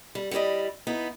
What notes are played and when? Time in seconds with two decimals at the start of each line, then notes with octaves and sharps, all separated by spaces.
0.15 G3
0.31 G3 E4 A#4 D5 D#5
0.87 B3 D#4 E4